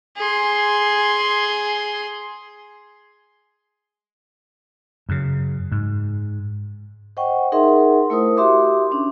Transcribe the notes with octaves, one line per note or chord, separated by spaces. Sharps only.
G#4 C6
F#2 C#3
G#2
C5 D#5 F#5 G5 C#6
D#4 G#4 A#4 E5 F#5 C6
A3 E4 A#4 C5 D#6
F#4 G4 E5 C6 D6
C#4 D4